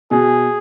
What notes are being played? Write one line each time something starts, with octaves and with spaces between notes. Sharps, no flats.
B2 G#4